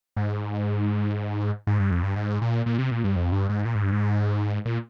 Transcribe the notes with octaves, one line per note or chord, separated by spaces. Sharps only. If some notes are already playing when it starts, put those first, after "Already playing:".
G#2
G#2
G2
F2
G2
G#2
A#2
A#2
C3
A#2
G2
F2
G2
G#2
A#2
G#2
G2
G#2
A#2